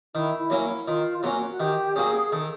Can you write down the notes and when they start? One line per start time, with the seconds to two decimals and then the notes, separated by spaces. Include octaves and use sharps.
0.15 D#3 E4
0.39 E4
0.50 F#3 A#3 C#4
0.87 D#3 F4
1.18 F4
1.23 F#3 A#3 C#4 F#4
1.51 F#4
1.60 D#3 G4
1.96 F#3 A#3 C#4 G#4
2.32 D#3 A4